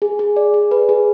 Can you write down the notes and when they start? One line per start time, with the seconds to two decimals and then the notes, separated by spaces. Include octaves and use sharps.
0.02 G#4
0.19 G#4
0.36 D5
0.54 G#4
0.71 B4
0.89 G#4